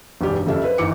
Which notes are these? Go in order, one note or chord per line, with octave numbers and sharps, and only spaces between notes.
E1 B1 G2 G3 G4 D5
F2 C#3 G3 A4 E5 F5
B4 C5
G#1 D#3 E3 E4 D6 C#7